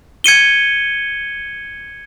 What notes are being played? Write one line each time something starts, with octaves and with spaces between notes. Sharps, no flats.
G#6 C#7 D#7 G7